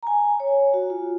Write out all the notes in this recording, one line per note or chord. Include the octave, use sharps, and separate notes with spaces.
A#5
G#5
C#5
F#4
F4